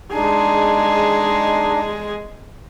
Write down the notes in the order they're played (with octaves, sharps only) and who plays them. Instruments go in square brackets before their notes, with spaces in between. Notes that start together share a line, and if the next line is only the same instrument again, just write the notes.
[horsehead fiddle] G#3 G#4 [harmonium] D4 D#4